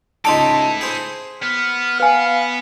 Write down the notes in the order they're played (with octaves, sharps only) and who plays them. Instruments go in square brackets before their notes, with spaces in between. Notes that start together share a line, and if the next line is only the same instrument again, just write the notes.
[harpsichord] C#2 D#4 D6 [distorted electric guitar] E4 A4 [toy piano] A5 C6
[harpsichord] G#4 C5
[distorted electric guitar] B3 [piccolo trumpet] F6
[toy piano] B4 G#5 [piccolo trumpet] F5